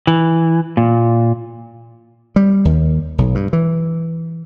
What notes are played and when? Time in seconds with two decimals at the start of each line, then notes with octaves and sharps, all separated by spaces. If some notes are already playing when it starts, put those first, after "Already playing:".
0.07 E3
0.77 A#2
2.36 G3
2.65 D#2
3.18 B1
3.35 G2
3.53 E3